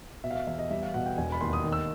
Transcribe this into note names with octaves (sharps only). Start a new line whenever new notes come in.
B2 E5
F5
E5
E2 E5
D#5
G3 E5
F5
B2 F#5
G5
E1 G#5
B5
D#2 C6
D#6
D#3
E6